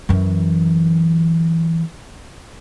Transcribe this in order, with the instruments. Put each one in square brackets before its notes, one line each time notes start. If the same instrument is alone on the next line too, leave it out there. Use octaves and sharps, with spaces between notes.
[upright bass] F#2 E3